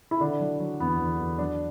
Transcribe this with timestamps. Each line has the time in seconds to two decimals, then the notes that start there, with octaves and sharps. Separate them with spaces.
0.11 E4
0.20 D3 D4
0.40 F#3
0.59 F#3
0.80 E2 B3
1.00 E2
1.19 E2
1.38 F#3 D4